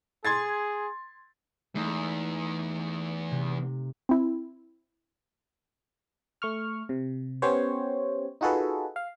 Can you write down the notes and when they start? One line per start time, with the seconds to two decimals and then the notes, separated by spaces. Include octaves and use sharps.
0.25 G#4 C6 G#6 A6
1.75 E2 A3 D#4
3.31 C3
4.09 C4 E4
6.42 A3 C#6 F6
6.89 C3
7.42 B3 C#4 G4 C5 C#5
8.41 D#4 F4 F#4 G#4 A4 B4
8.96 F5